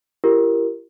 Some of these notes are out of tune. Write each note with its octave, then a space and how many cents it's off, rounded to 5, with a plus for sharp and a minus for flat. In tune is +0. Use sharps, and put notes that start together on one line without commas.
E4 +45 G4 +0 A#4 +0